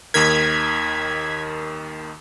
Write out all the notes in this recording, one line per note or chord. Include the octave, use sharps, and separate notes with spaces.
D#2 D#3 A#4 G#6 B6